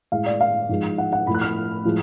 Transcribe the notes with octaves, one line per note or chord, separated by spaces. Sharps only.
A2 G#3 F5
D5
F5
G#2 F3 G#3
F#5
F#5
A2 F3 A3 B5
F#6
F6
A2 F3 G#3